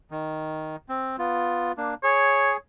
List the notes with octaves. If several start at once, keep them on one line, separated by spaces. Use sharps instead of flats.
D#3
C4
B3 F4
A#3 D4
G#4 C#5